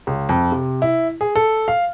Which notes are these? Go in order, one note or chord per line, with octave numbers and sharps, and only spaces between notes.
C#2
F2
C3
E4
G#4
A4
F5